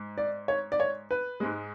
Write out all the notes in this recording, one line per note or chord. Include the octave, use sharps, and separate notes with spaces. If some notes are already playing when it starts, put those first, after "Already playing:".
Already playing: G#2
D5
C#5
D5
C#5
B4
G#2 G#3